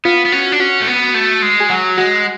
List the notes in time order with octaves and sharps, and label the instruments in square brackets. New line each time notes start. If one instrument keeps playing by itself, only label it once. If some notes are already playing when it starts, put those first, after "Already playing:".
[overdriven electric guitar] B3 [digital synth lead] F4
[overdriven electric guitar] B3
[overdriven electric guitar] C#4 [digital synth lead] F#4
[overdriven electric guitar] D4
[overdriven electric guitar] C#4 [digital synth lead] F#4
[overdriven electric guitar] A3
B3
A3
G#3
[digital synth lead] G#4
[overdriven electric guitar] F#3 [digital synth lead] F#4
[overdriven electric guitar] G#3 [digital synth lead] F#4